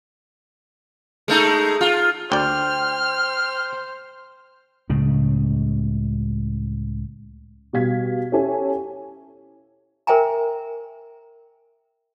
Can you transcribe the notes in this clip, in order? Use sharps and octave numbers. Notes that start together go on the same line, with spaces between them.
G#3 A3 D#4
F4
D2 C5 D5 G5 F6
C#2 A2 C#3
B2 G3 G4 F5 G#6 B6
C#4 E4 G4 A4 C#5 G#5
A#4 C5 E5 G5 G#5 A#5